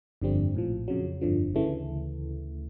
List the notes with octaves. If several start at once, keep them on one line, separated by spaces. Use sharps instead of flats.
G1 F2 D3 G3 C4
A#1 A2 F3
F2 C#3 F#3
G1 F2 D3 F3
D2 C#3 E3 A3